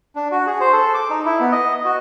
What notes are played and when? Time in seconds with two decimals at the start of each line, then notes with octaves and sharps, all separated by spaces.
0.16 D4
0.31 F#4
0.47 G#4
0.61 C5
0.73 A4
0.94 D6
1.10 D#4
1.25 E4
1.40 B3
1.52 D#5
1.85 F#4